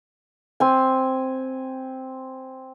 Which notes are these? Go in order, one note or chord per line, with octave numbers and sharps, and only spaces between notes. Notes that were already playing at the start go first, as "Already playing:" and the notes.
C4 G#5